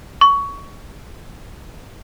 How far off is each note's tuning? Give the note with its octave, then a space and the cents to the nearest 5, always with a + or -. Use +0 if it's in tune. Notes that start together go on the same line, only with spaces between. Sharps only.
C#6 +20